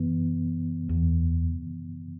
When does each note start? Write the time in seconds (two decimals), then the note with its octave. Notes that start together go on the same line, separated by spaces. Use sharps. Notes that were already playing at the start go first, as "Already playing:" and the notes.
Already playing: F#2 E3 B3
0.89 E2